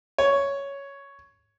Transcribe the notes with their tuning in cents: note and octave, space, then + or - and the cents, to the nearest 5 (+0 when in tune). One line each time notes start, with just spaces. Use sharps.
C#5 +5